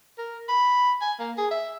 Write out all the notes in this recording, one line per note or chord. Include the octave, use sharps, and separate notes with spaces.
A#4
B5
G#5
A#3
G#4
E5